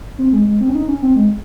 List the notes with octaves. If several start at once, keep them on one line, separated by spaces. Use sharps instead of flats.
C4
G#3
G#3
C4
C#4
D#4
C#4
C4
G#3